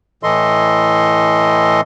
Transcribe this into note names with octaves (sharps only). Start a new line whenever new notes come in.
A2 E3 A4 D#5 C6